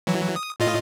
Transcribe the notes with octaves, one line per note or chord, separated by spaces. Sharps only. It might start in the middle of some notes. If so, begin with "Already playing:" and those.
E3 F#3
D#6
A2 F4 D#5